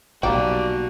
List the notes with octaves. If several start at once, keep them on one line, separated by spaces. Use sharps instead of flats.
B1 A#2 G3 A#3 F#4 G5 A5